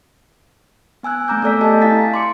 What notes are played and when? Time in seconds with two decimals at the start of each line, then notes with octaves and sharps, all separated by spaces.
1.03 B3 G#5 E6 F#6 G#6
1.28 A3 C4 G#5 A#5 D6 G6
1.42 A3 B3 A4 D5 E6 B6
1.61 G4 A4 D#5 G#5 A5
1.82 E4 F5 G#5 A#5 A6 B6
2.14 C6 D6 C#7